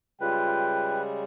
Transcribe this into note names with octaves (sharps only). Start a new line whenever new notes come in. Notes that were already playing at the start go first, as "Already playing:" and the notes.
C#3 G3 G#3 F4 B4 G5